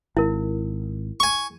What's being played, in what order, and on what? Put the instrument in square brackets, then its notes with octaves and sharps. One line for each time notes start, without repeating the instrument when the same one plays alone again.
[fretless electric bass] G#1 [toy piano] E4 A#4
[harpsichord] G#5 C#6